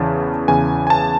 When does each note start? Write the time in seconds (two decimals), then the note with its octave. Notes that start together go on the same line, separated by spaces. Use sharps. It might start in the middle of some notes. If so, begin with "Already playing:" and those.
Already playing: E2 C#3 E3 A5
0.48 E2 C#3 E3 G#5
0.87 G#5
0.90 A5